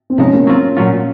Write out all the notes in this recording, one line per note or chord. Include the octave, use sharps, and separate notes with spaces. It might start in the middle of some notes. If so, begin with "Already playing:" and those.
C4
C3 F3 G#3 C#4 D#4
A#3
F#3 C4 F4
A#2 F#3 C#4 F4